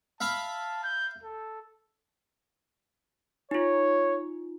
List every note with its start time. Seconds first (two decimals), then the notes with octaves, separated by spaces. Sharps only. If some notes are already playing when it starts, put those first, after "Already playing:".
0.21 E5 F5 A5 B5
0.84 G6
1.23 A4
3.51 D#4 F4 C#5